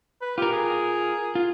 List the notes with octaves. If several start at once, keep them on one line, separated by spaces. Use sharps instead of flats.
B4
F4 G4 A#4
G#4
F4